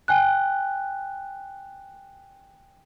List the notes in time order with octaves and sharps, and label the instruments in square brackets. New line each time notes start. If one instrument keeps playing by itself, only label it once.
[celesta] G5 G#5 F#6